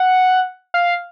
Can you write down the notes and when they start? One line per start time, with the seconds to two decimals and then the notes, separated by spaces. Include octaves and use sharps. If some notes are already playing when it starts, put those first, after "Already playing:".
Already playing: F#5
0.74 F5